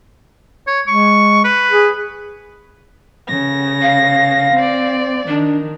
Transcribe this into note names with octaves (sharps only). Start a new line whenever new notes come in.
C#5
G#3 C#6
B4
G#4
C#3 A#6
F5
C4 D5
D#3 D4